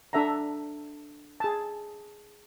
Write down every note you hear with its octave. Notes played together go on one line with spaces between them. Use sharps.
D4 A4 E5 F#5 A#5
G#4 A5